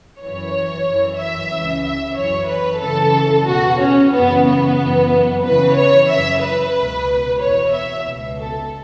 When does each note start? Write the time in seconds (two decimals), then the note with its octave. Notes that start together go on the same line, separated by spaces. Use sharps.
0.20 F#2 E3 C#5
0.85 F#2 E3
1.18 E5
1.51 C#2 C#3 E3
1.84 E5
2.16 F#2 E3 C#5
2.49 B4
2.82 F#2 C#3 E3 A4
3.48 E2 B2 F#4
3.80 C#4
4.13 F#2 C#3 E3 B3
4.46 B3
4.78 F#2 E3
5.44 E2 C#3 E3 B4
5.78 C#5
6.09 F#2 C#3 E3 E5
6.43 B4
6.75 C#2 B2
7.41 E2 B2 C#5
7.73 E5
8.06 C#2 B2
8.39 A4